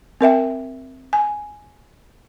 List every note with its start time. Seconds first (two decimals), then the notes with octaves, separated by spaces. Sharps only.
0.21 C4 A#4 E5 G5
1.13 G#5